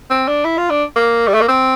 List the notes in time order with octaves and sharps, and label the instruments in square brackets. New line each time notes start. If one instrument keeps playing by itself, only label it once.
[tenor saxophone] C4
D4
E4
F4
D4
A#3
G3
A3
A#3
C4